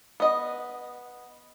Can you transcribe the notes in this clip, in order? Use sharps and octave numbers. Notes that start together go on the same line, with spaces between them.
B3 D#5